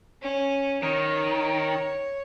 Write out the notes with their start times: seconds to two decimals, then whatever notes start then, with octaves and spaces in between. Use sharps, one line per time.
0.22 C#4
0.83 D#3 C#5